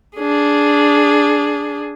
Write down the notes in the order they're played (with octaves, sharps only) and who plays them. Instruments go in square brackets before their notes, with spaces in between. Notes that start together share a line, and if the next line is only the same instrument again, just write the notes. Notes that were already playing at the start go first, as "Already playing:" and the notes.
[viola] D4 G#4